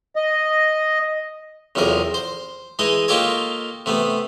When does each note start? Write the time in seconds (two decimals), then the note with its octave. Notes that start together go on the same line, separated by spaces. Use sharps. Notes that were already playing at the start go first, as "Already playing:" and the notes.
0.16 D#5
1.75 B1 E2 C3 F3 A#4
2.14 C5
2.79 E3 G#3 D#4 D#5
3.08 A#3 D#4 F4 G4 A4 C#5
3.86 C3 A3 B3